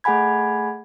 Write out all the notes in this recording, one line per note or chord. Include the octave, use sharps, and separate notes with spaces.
A3 G#4 F#5 G#5 B5 G#6